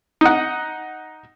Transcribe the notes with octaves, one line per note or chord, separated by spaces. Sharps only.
D#4 F#5